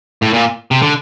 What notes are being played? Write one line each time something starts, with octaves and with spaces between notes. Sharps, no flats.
A2
A#2
C3
D3